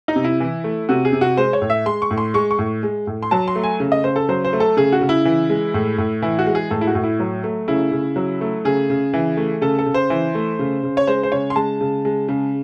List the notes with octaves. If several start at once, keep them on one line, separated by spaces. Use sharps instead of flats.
D#4
C3
E4
E3
A3
C3 F#4
G#4
C3
F#4
G#3 C5
C#5
A2
E5
G#3 C6
C#6
A2
C6
G#3 C#6
C#6
A2
G#3
A2
C6
F#3 A5
C6
A3
G#5
C#3
D#5
C#3 C5
A4
F#3 C5
C5
A3
A4
C#3 G#4
F#4
C#3
E4
E3
G#3
A2
A2
E3 E4
F#4
G#3
G#4
A2 A4
E4
F#4
A2
E4
F#3
A3
C#3 E4
C#3
F#3
A3
C#3 G#4
C#3
E3
A3
C#3 A4
A4
C#3
C5
E3
A3
C#3
C#3
C#5
G#3 C5
C5
C#3 C#5
C6
G#3 A5
C#3
G#3
C#3